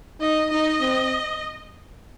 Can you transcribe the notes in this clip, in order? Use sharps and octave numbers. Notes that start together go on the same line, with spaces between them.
D#4 D#5
D#4 D#5
C4